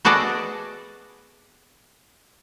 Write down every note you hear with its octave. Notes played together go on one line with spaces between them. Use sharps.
B3 F#4 G#4 A4 D5 D#5